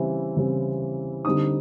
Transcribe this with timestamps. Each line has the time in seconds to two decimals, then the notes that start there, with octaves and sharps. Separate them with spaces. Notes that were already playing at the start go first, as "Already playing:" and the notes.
Already playing: C#3 E3 G3 C4 E4
0.36 C#3 E3 G3 C4 E4
1.25 D3 G3 C4 D#4 D#6